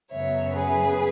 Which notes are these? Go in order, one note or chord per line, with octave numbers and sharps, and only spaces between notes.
F#2 C#3 F#3 B3 C#5 E5
G#4 B4